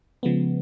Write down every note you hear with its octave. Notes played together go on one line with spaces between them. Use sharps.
C#3 F3 G#3 B3